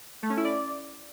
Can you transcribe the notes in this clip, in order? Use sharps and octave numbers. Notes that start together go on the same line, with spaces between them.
A3
C#4
E4
D5